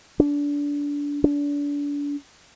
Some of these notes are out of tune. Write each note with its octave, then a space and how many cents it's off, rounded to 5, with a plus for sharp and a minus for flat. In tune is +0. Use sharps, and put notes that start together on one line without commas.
D4 -25
D4 -30